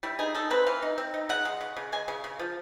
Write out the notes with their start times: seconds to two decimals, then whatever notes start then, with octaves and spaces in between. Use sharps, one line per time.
0.03 G3 E4
0.19 D#4 G#4
0.35 D#4 A4
0.50 C4 B4
0.66 E3 F5
0.82 D#4
0.98 C4
1.14 D#4
1.29 C#3 F#5
1.45 G#3
1.61 C#3
1.77 C#3
1.92 G#3 G#5
2.08 C#3
2.24 C#3
2.39 F3